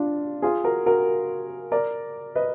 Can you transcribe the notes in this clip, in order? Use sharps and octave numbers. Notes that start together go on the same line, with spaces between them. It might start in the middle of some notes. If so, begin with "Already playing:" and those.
Already playing: D4 F4
F4 G#4
F#4 A#4
F#4 A#4
A#4 D5
B4 D#5